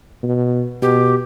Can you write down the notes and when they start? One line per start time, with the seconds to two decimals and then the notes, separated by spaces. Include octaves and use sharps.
0.23 B2
0.82 B2 G4